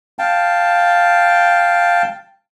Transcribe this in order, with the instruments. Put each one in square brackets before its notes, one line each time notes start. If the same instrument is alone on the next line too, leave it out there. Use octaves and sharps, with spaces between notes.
[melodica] F5 G5 A5